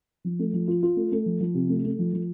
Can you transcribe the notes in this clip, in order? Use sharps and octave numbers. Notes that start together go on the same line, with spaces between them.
F3
A3
F3
F4
F4
A3
A3
F3
F3
C3
A3
A3
F3
F3